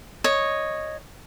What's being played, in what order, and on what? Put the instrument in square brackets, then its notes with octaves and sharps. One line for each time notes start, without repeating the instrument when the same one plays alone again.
[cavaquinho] C#5 D#5